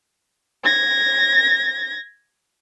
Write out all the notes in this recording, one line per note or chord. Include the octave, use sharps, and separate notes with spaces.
G#6 A#6